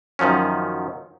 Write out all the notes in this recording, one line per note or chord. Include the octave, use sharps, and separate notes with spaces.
F#2 D#3 F3 F#3 C#4